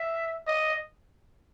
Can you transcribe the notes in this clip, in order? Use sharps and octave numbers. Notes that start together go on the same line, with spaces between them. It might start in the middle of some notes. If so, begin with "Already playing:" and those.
Already playing: E5
D#5